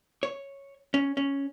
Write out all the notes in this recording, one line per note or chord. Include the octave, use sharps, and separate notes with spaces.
C#5
C#4
C#4